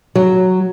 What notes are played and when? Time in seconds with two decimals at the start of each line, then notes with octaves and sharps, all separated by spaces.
0.15 F#3